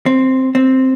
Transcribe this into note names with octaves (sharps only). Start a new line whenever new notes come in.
C4
C4